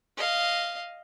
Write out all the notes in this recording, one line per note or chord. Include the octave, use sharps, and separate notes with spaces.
D#5 F5